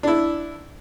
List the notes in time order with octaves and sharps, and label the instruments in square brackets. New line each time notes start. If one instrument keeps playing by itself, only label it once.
[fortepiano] D4 E4